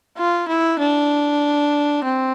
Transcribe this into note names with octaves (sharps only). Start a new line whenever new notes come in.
F4
E4
D4
C4